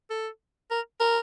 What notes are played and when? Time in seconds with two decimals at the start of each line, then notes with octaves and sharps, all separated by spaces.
0.10 A4
0.71 A#4
1.00 A#4